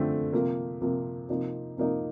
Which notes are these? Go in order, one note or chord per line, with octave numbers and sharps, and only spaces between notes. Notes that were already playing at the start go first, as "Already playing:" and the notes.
Already playing: D3 F3 A3 C4
C3 F3 A#3
C3 F3 A#3
C3 F3 A#3 D#4
C3 F3 A#3 D#4